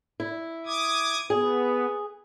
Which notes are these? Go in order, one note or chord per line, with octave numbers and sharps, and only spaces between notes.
E4
D6 D#6 G#6
B3 G#4